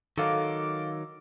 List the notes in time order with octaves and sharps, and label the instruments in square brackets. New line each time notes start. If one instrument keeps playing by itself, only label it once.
[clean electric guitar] D#3 F#3 D#4 [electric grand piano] A4 F5 [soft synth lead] D6